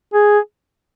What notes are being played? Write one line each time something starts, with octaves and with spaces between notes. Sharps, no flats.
G#4